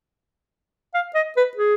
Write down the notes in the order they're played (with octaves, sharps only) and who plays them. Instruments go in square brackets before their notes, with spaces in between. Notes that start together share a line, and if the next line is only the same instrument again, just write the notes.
[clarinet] F5
D#5
B4
G#4